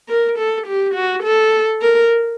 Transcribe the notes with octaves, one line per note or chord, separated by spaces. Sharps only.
A#4
A4
G4
F#4
A4
A#4